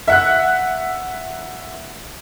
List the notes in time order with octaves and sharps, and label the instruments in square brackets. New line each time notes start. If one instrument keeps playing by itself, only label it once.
[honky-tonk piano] E5 F#5 F#6